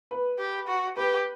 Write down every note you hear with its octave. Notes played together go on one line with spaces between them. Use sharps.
B4
G4
F#4
G4 B4